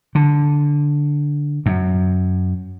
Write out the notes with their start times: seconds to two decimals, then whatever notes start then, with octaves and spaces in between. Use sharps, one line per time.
0.15 D3
1.66 F#2